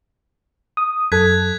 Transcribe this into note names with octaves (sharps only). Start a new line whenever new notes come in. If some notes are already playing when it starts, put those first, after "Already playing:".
D#6
F#2 A4 F#6 G#6 B6